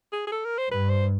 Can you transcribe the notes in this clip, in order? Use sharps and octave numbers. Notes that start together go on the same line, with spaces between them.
G#4
G#4
A4
A#4
C5
G2 B4
C5